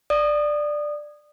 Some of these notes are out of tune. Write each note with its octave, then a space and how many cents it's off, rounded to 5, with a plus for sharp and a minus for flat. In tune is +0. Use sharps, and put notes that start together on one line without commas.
D5 +10 D#6 -20